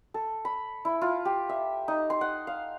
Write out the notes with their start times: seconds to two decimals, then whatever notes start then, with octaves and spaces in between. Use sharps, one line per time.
0.14 A4
0.45 B5
0.85 E4
1.01 F4
1.25 G4
1.49 E5
1.88 D#4
2.10 C6
2.21 F#5
2.47 F5